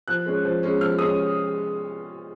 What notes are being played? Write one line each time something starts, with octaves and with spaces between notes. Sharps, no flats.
F3 F#6
G#3 C#4
F3
G#3 C#4
F3 F6
G#3 C#4 D#6